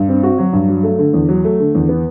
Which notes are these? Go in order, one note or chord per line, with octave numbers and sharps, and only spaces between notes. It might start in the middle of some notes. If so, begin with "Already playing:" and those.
Already playing: G2
C4
F#4
F#3
G2
F#3
A3
D3
E2
F#3
A3
D3
E2
B3